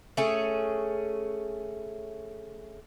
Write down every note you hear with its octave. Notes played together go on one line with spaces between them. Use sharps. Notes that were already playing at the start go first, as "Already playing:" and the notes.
A3 C#4 G#4